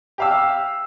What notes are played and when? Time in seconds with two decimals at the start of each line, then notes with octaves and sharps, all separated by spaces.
0.18 G4 F5 E6